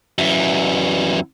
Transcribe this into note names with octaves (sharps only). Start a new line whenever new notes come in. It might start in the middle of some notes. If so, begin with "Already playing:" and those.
F#2 E3